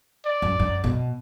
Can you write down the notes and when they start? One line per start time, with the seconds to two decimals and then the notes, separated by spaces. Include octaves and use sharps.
0.26 D5
0.42 F#2
0.59 F#2
0.84 B2